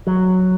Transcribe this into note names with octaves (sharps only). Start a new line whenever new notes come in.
F#3